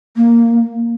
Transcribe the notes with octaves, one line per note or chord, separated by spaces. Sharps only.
A#3